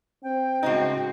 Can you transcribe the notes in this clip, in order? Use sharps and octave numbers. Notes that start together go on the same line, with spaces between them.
C4 G5
A2 C#3 G#3 C4 D#4 F#4